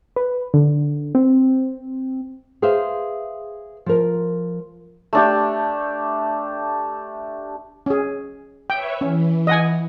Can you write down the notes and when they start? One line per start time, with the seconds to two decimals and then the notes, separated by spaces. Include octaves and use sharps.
0.16 B4
0.54 D3
1.15 C4
2.62 G#4 B4 C5 E5 F5
3.86 F3 A#4
5.13 A3 D4 G4
7.86 C#4 G#4
8.70 B4 C#5 E5 G5
9.01 E3 C#4
9.47 D#5 F#5 G#5